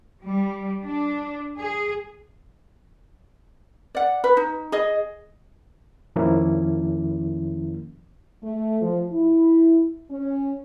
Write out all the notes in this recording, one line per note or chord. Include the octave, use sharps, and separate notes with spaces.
G3
D4
G#4
D5 F#5
B4
D#4
G#4 D#5
F2 D#3 F3 A#3 C#4 E4
A3
F3
E4
C#4